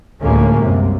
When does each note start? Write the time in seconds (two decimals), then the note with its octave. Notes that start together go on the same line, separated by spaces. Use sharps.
0.22 D2 A2 F3 G#3 A#3 C#4
0.61 C2 F#2 C3